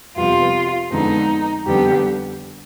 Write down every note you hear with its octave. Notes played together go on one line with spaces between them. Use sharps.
F2 C3 G3 B3 F4
F2 D3 G#3 B3 D#4
F2 D3 G3 B3 G4